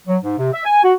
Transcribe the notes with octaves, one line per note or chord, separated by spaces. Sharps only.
F#3
G#2
C3
E5
G#5
F#4